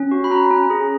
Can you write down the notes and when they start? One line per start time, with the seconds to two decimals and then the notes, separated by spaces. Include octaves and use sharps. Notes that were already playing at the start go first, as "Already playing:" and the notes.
Already playing: C#4
0.11 F#4
0.24 B5
0.31 C#4 A#5
0.51 C#4
0.70 G#4